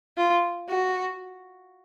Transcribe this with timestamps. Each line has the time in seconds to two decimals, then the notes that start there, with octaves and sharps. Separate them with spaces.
0.17 F4
0.69 F#4